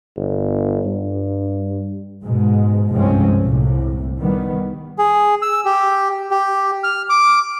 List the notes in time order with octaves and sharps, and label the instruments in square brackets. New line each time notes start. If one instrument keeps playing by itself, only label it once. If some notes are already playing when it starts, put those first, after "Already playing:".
[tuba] G1
G2
[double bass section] G#2 B2 G#3
C2 G2 F3 G#3 C4 C#4
C2 A2 C3
D#3 G3 B3
[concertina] G#4
E6
G4
G4
F6
D6